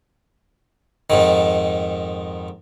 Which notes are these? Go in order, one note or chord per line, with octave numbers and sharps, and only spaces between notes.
F2 G#2 D#3